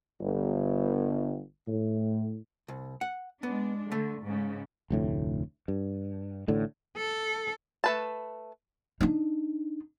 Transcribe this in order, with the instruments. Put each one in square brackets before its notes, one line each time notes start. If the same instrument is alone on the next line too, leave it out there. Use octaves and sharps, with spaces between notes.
[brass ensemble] G1
A2
[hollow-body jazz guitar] C2
F#5
[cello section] G#3 D4 [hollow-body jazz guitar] B3
[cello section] D3 [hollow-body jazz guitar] A3
[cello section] G#2 C#3
[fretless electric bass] F1 D2 A2
G2
A1 A2 D3
[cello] A4
[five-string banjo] A3 B4 A5
[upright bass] D4 D#4